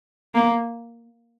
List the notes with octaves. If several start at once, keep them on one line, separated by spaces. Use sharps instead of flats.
A#3